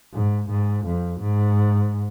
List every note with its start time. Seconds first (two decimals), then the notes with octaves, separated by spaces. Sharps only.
0.13 G#2
0.49 G#2
0.86 F2
1.20 G#2